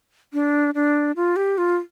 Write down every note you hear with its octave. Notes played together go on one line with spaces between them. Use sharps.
D4
D4
F4
G4
F4